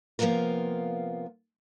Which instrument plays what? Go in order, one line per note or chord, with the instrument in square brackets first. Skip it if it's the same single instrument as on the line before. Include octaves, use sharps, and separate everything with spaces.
[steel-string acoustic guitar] C3 F3 A#3 B3 F4 A#4